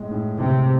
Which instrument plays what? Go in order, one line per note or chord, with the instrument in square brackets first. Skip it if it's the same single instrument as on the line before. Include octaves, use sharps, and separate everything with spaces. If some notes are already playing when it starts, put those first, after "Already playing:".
Already playing: [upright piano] A2 G#3
A2
[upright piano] A2 [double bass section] C3